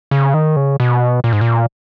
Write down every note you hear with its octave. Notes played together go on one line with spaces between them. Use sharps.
C#3
D#3
C#3
B2
A#2
G#2
A#2